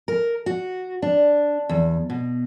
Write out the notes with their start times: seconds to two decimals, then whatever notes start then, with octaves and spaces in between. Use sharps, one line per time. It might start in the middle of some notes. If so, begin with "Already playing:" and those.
0.08 A#4
0.46 F#4
1.02 D4
1.69 E2
2.10 B2